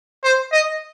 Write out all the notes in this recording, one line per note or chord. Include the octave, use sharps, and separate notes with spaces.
C5
D#5